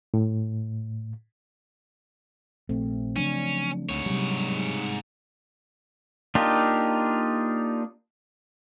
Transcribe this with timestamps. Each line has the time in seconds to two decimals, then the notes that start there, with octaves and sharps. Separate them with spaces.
0.14 A2
2.69 A#1 A3 C4
3.16 C#3 F3 F#3 C#4 D4
3.89 D2 G#2 C#5
4.06 C3 F#3 G3
6.35 A#3 D4 D#4 F4 G4